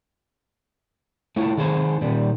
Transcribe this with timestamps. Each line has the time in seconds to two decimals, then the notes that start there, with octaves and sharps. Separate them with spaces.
1.36 A3 E4 F4 C#5
1.58 D#3 G#4 A4 C5
2.01 A#2 D#3 G3